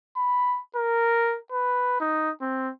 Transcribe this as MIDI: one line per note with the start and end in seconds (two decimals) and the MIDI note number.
0.16 0.59 83
0.76 1.37 70
1.52 1.97 71
2.00 2.31 63
2.41 2.70 60